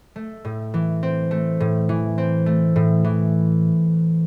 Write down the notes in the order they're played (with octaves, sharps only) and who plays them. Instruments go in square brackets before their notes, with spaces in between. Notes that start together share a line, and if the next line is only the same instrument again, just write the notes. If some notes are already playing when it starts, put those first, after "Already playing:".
[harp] A3
A2
E3
C4
A3
A2
E3
C4
A3
A2
E3